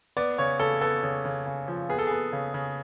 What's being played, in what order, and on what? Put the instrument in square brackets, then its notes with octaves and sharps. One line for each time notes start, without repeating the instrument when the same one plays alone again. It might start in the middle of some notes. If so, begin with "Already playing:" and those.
[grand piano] B3 D5
C#3 C#5
C#3 A4
B3 A4
C#3
C#3
C#3
F3
B3 G#4
A4
B3 G#4
C#3
C#3